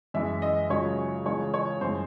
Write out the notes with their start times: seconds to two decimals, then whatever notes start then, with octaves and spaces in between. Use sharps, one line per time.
0.14 F#2 E3 G#3 E5
0.42 D#5
0.70 C#2 C#3 F#3 C#5
1.25 C#2 C#3 E3 C#5
1.54 C#5
1.81 F#2 E3 G#3 C5